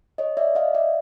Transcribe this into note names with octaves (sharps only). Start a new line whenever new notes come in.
C#5 D#5
D5 E5
D#5 F5
D5 E5